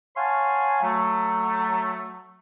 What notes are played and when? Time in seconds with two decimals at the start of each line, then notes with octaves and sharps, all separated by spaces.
0.17 C#5 F5 F#5 G#5 A5 C6
0.82 F#3 A3